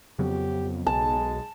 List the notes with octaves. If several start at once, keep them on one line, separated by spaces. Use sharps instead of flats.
F2 C#3 F#3 B3 G4
B1 G#3 A5